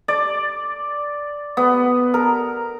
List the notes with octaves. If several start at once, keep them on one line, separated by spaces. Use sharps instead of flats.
D5
B3
A#4